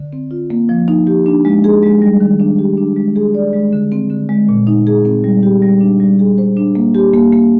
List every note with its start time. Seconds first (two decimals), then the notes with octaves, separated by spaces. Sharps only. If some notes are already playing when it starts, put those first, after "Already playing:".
Already playing: D3
0.13 C4
0.31 F4
0.50 A#3
0.69 F3
0.88 D#4
1.07 G4
1.26 D4
1.45 G#3
1.64 G#4
1.83 G#3
2.02 G3
2.20 D#3
2.40 D4
2.59 G4
2.77 D4
2.96 G#3
3.16 G#4
3.34 D5
3.53 G#3
3.73 D3
3.92 C4
4.10 D3
4.29 G#3
4.49 A#2
4.67 D#4
4.87 G#4
5.05 C4
5.24 G3
5.43 G4
5.62 G3
5.81 D4
6.00 G3
6.19 G#4
6.38 C5
6.57 D4
6.75 A#3
6.95 G4
7.14 A#3
7.32 A#3